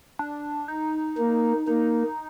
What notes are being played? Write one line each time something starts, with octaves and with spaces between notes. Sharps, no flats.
D4
D#4
A#3
A#3 D#4